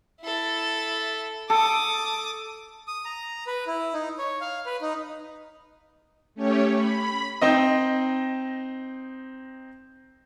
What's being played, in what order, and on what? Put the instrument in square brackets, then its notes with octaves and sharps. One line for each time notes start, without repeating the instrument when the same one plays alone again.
[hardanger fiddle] E4 A4
[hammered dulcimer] A4 [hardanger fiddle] D6 D#6
[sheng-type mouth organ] D#6
A#5
B4
E4
D#4
C#5
F5
B4
D#4
[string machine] A3 C#4 G4 C#5
B5
[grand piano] C4 D#4 D#5